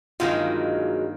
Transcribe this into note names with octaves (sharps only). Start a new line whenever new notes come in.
G2 D#3 F#3 G#3 A#3 F4